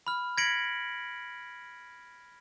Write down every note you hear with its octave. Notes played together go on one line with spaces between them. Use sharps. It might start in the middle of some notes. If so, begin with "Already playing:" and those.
B5 F6
G#6 A#6 B6 C#7 D7 F#7